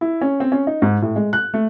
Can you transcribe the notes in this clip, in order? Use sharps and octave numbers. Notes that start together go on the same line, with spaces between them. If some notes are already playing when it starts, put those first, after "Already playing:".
E4
C#4
C4
C#4
D#4
G#2
A2
G#3
F#6
A3